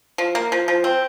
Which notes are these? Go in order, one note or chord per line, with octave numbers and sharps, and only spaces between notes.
F3
A#3
F3
F3
C4